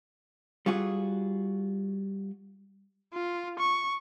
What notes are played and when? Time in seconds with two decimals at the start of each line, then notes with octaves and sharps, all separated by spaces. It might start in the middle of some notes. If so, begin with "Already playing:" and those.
0.66 G3 F4 F#4 G#4
3.13 F4
3.59 C#6